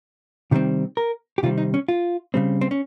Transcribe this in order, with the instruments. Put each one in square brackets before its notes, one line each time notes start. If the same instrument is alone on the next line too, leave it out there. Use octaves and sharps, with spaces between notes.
[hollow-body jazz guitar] C3 D#3 G3 C4
A#4
G4
C3 D#3 G3 C4 F4
D#4
C#4
F4
C#3 G3 C4
C4
C#4